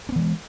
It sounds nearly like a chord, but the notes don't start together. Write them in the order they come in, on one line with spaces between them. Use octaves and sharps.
C#4 B3 E3 G#3